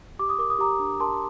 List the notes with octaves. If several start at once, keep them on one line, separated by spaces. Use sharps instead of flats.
G4 D6
D#6
A#4 D6
D#6
G4 A#5 D6
D4
A#4 A5 C6